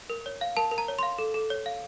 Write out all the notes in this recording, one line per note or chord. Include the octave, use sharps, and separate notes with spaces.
A#4
C#5
F5
A#4 A5
A#4
A#5
C#5
F5 C6
A4
A4
C#5
F5